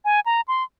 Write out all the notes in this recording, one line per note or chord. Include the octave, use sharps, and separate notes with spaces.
G#5
A#5
C6